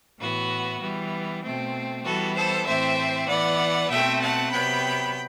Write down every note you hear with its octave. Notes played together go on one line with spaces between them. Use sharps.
A2 E3 B3 F#4
E3 G3 B3
B2 A3 C4
E3 G3 B3 F#4 A4
A4 C5
A2 E3 A3 C4 C5 E5
E3 B3 D5 F#5
B2 A3 C4 E5 G5
F#5 A5
C3 F#3 B3 G5 B5